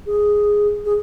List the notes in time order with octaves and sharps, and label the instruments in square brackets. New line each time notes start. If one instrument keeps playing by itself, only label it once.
[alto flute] G#4
G#4